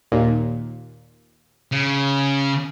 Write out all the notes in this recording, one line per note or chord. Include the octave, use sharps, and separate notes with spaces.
D#2 A#2
C#3